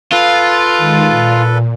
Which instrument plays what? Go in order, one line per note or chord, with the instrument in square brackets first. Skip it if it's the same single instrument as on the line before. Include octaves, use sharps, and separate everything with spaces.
[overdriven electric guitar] F4 [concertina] A4 B4
[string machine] D#3 G#3
A#2